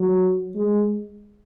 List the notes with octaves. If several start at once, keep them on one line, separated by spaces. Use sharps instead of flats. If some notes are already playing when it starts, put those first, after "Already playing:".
Already playing: F#3
G#3